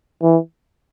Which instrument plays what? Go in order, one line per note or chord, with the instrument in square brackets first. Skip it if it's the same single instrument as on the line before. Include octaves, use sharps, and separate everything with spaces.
[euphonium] E3